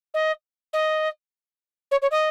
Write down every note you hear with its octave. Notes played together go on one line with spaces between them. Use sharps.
D#5
D#5
C#5
C#5
D#5